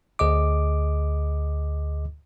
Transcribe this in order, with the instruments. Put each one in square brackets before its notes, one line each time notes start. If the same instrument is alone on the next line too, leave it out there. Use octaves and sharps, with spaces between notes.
[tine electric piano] D2 G#4 D#5 D6